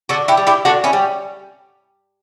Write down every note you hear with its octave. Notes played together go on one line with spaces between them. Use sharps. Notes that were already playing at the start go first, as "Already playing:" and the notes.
D3 F#4 A4
E4 G4
G3
E4 G4
D3 D4 F#4
C#4 E4
G3